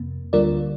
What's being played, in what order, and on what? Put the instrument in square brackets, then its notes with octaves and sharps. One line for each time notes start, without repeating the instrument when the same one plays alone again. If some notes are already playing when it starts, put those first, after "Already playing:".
Already playing: [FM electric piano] F2 C3 A#3
D2 D3 G3 A#3 F4 A#4 D5